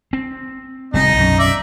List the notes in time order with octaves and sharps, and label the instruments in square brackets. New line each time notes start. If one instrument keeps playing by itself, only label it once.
[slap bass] C4
[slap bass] F1 G3 C4 [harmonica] D#4
[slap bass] B1 F#2 C#4
[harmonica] D5 E5